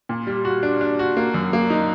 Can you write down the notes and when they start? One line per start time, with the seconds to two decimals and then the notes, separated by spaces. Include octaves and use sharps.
0.09 A#2
0.27 G3
0.45 F#4
0.63 D4
0.81 D4
0.99 F#4
1.17 A#3
1.34 F#2
1.53 A#3
1.70 D#4